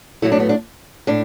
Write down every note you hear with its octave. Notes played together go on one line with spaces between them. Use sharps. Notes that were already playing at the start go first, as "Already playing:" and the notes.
A2 F#3 A3 E4
D4
B3
D4
A2 D4